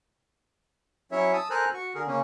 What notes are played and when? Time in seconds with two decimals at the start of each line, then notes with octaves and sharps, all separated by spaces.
1.12 F#3 C#4 E4 C#5 E5
1.33 A5 D#6 E6
1.50 A4 A#4 C5 G#5 A#5 F#6
1.74 F#4 C#6
1.95 D3 G#4 A#4
2.07 C#3 A#3 C#4